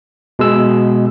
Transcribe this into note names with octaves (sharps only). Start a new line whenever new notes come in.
B2 G#3 E6